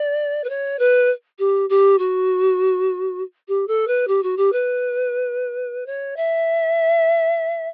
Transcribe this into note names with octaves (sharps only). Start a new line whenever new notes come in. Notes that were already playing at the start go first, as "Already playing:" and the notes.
Already playing: D5
B4
C#5
B4
G4
G4
F#4
G4
A4
B4
G4
F#4
G4
B4
C#5
E5